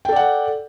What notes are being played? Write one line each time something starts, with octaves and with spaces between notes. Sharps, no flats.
A4 D5 F#5 G5